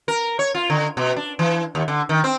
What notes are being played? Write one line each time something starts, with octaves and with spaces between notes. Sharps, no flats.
A#4
C#5
F4
D3
B2
D4
E3
D#2
D3
D#3
C4